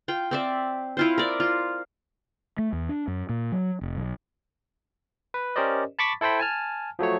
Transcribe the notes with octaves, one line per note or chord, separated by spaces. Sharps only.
F4 G5
C4 D5 E5
E4 F4 C5
A#4 D5
F4
A3
E2
D4
F#2
A#2
F#3
F1
B1
B4
C#4 G4 A#4 C5 D5 D#5
A5 B5 C#6 D6 A6 B6
E4 A4 C5 G5 B5
G#5 A5 F6
F3 F#3 A3 C#5